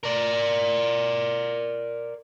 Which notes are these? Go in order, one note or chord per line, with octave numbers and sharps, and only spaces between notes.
A#4 D5